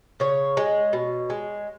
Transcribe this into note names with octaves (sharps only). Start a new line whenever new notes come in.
C#3 C#5
G#3
B2
G#3